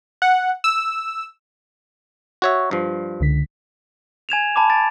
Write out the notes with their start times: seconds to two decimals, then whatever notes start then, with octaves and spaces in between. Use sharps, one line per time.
0.22 F#5
0.64 E6
2.42 F#4 C#5 E5
2.71 G2 F3
3.20 C#2 D3 B6
4.29 G#5 G#6 E7 F7
4.56 G#5 A5 B5 D6
4.70 A6 D7